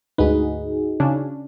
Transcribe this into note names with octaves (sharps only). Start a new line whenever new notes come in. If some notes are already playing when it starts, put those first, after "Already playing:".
D2 G#2 D#4 F#4 G#4 B4
C#3 C#4 D4